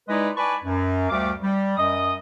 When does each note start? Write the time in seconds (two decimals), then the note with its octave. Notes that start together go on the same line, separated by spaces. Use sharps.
0.09 G#3 D#4 E4 B4 D5 D#5
0.37 B4 D5 G#5 A5 B5 C#6
0.64 F#2
1.09 D2 G3 A3 F5 D6
1.41 G3
1.77 F#2 D#5 D#6